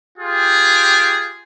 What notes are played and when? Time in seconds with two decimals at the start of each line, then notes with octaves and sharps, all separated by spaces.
0.18 F4 G4 G#4